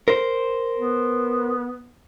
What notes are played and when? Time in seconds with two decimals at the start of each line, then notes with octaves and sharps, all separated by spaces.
0.08 A#4 C5
0.78 B3